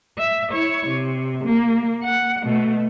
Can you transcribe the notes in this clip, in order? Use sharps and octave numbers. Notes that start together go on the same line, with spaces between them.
E5
E4 C#5
C3
A#3
F#5
B2 A3